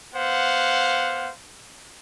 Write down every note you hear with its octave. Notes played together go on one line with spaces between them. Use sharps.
B3 C5 F5 F#5